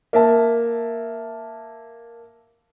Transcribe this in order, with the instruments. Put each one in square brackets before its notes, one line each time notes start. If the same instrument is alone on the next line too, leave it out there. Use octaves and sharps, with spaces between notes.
[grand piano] A#3 E5 A5